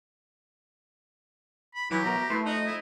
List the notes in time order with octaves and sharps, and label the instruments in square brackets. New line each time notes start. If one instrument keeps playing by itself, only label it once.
[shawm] B5
[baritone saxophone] E3 [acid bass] F#3 [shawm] G4
[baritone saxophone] B2 [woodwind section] A3 A#4 A#5
[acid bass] A3 [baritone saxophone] E4 [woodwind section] B4 C6
[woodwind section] F2 D#5 [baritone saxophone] D#4 [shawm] F#4
[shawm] E4